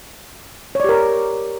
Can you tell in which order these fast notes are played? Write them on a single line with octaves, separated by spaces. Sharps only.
C#5 D5 G4 A#4